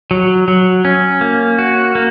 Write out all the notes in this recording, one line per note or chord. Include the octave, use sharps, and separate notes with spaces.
F#3
F#3
C#4
A#3
F#4
A#3